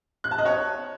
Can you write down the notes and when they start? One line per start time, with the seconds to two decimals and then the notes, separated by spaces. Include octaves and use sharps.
0.24 F#6
0.31 A5
0.38 D#5
0.45 C#5